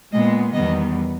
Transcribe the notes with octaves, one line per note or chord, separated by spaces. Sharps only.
A#2 G#3 B3 D#5
E2 D#3 G3 B3 D#5